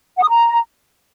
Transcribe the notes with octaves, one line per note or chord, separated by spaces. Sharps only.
F#5
D#6
A#5